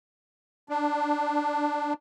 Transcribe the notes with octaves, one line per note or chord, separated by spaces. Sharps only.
D4